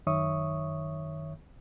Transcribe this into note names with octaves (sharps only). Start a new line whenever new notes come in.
F#2 D#3 C#5 E5 C#6 D#6